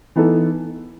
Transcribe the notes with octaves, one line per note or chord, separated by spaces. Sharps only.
E3 B3 D#4 A4